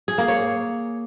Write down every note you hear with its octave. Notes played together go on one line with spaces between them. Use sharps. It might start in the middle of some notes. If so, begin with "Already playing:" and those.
G#4
A#3
C#5